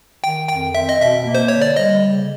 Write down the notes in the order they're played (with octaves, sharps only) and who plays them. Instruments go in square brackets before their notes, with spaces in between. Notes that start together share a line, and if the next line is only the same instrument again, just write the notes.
[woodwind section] D#3 [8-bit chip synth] G5
[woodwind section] F2 [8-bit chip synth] G5
[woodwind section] C4 [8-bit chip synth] E5
[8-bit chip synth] D#5
[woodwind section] B2 [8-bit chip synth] E5
[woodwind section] A#3
[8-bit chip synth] C5
[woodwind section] D3 [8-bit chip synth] C#5
[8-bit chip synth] D5
[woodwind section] G3 [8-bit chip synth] D#5
[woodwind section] C#3